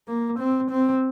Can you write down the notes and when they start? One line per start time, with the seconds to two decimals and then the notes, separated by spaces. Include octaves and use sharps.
0.08 A#3
0.39 C4
0.70 C4